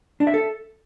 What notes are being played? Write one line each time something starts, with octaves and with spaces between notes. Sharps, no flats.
D4
E5
A4